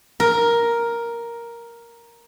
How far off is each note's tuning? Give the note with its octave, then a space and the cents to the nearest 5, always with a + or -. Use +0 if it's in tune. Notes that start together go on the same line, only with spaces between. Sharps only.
A#4 +5